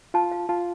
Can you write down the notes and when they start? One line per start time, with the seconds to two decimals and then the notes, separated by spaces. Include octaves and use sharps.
0.14 F4 A5
0.32 F5
0.49 F4 A5